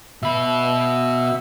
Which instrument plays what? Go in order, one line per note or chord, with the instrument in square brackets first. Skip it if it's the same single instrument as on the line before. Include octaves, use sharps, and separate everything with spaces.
[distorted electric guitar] B2 B5 [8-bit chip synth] E5 E6